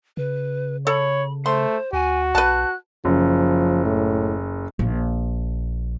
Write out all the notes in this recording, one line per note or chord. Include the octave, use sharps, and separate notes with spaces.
C#3 B4
A4 C#5 B5
A3 C5 C6
D2 F#4 G#5
B1 B4 A5 F#6
F#1 F3
A2
A#1